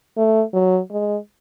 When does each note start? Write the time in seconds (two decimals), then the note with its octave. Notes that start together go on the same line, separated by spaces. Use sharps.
0.17 A3
0.54 F#3
0.91 G#3